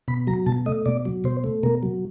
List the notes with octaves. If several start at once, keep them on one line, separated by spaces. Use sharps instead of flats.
B2 B5
F#3 A#5
B2 A5
A3 D#5
B2 D5
F#3
B2 C5
A3
B2 A#4
F#3